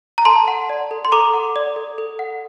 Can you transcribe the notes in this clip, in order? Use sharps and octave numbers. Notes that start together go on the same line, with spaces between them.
A#5
A4 A5 C6
F#5
D5
A4
C6
A4 A#5 D6
F#5
D5
A4
A4
F#5